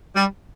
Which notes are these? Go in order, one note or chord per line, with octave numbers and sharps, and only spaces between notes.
G3